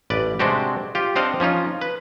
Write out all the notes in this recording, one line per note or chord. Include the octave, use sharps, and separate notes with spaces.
A1 B4 D5
C3 G#3 C4 D4 F#4 G4
F4 G4
C4 D4 C5 D#5 F5 F#5
F3 C#4 D#4 F4
B4